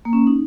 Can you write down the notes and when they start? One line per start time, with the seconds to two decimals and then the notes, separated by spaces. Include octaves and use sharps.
0.05 A#3
0.13 C#4
0.27 D#4